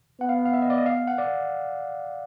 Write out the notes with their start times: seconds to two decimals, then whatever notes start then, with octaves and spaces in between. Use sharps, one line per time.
0.21 B3 F#5
0.29 F5
0.46 F5
0.53 E5
0.62 D#5
0.70 D5
0.78 D#5
0.86 F5
1.07 F#5
1.18 D5